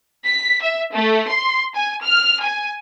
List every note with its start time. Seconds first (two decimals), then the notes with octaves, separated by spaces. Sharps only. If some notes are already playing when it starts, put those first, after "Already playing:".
0.24 B6
0.61 E5
0.93 A3
1.29 C6
1.74 G#5
2.04 F6
2.43 G#5